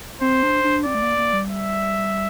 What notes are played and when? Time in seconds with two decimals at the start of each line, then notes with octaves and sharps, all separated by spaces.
0.21 C4 C5
0.43 D4
0.64 D4
0.85 C4 D5
0.95 A3
1.02 A#3
1.18 A#3
1.33 G3
1.50 E5